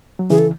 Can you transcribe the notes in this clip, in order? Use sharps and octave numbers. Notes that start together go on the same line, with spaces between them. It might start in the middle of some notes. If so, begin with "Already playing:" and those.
F#3
C#3 E3 G#4
A4